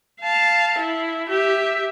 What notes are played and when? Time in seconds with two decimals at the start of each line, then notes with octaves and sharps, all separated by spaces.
0.21 F5 A5
0.79 E4
1.29 G4 E5